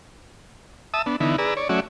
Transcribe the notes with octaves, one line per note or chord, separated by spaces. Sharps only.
E5 A5 D#6 E6
B3 D4
D3 E3 B3 D#4 E4
G#4 B4 D5 A#5 E6
C#5 D5
F#3 A3 C#4 F#4 D5 E5